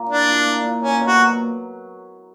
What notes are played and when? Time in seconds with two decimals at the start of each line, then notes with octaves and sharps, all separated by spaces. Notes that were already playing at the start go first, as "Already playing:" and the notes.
Already playing: A#2 A#3
0.09 D4 E4
0.28 A#2
0.46 A#3
0.64 A#2
0.82 A#3 C#4
0.99 B2
1.06 F#4
1.18 F#3